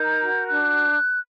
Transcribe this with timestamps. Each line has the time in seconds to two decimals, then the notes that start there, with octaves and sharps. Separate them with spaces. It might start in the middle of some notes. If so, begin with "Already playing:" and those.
Already playing: D#4 A#4 G6
0.21 F#4
0.49 D4 F#6